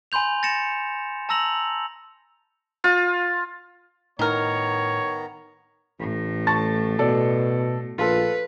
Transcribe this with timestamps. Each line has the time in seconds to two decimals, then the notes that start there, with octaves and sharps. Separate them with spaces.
0.12 G#5 B5 C6 G6 F7
0.43 A6 A#6 C#7 E7
1.29 A5 A#5 E6 A#6 F7 F#7
2.84 F4
4.19 A2 D#3 B3 D#4 A#4 C#5 A#5
6.00 A1 A2
6.47 A5 C#6 A6
6.99 B2 A4 D5
7.98 A#1 F4 A4 B4